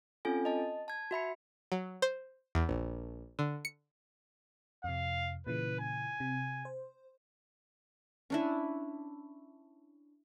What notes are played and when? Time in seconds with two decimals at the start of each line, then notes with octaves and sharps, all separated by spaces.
0.25 C4 C#4 F4 A4 G#5
0.45 D#5 A5
0.88 A5 G#6
1.11 F#4 E5 B5 C#7
1.72 F#3
2.02 C5
2.55 E2
2.69 A#1
3.39 D3
3.65 C#7
4.84 F2 C3 F5
5.47 A#2 C#3 E3 B4
5.80 G#5
6.20 C3
6.65 C5
8.30 C#4 D4 E4